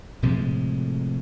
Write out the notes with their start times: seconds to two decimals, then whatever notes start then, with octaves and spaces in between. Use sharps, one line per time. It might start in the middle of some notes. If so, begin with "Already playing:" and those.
0.22 A2 C3 F3 G#3